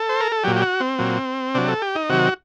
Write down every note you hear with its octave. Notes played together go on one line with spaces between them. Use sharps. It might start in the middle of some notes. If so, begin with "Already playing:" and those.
Already playing: A4
C5
A#4
A4
A#2 F#3 G4
G4
F#4
C4
A#2 F#3
C3 F#3 D4
A4
G4
D#4
C3 D#3 F#3 F#4